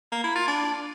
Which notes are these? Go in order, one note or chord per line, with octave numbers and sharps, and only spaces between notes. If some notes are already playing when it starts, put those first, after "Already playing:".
A#3
E4
F4
D4